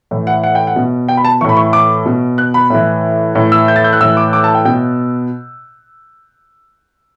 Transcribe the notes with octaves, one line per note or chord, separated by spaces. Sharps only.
A2 E3
F#5
F#5
G5
F#5
B2
G5
B5
A5
A2 E3 B5 C#6
C#6
D6
B2
F#6
B5
A2 E3
A2 E3
E6
G6
A6
G6
F#6
A2 E3 E6
D6
D6
A5
G5
B2 G5